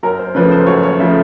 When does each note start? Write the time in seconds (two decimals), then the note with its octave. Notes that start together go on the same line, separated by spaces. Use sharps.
0.03 F#2 A#4
0.19 C5
0.35 C#3 F3 A3 B4
0.51 C5
0.67 F#2 C#5
0.83 C#5
0.99 C#3 F3 A3 E5